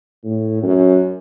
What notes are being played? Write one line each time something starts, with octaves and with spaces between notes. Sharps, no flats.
A2
F#2